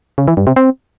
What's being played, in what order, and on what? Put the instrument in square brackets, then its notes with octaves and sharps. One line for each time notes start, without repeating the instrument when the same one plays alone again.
[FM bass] C#3
E3
G2
C3
C4